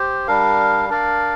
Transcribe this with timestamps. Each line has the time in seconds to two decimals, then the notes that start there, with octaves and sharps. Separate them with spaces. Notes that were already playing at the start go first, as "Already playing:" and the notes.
Already playing: G4 C5
0.27 G3 D4 A#4 F5
0.89 D4 A#4 D5 F5